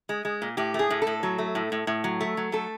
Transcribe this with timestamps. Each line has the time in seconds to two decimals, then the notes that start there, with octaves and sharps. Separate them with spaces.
0.09 G#3
0.25 G#3
0.42 A#2
0.57 A2 G4
0.74 A3 G#4
0.90 A2
1.02 A4
1.07 A2
1.23 F#3
1.39 A3
1.55 A2
1.72 A2
1.87 A2
2.04 F#3
2.21 A3
2.37 F#3
2.52 A3 A4